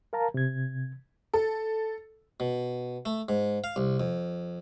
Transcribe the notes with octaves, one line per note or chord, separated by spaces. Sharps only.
A#4 F5 A5 A#5
C3 G#6
A4
B2
A3
G#2
F5
C2
F2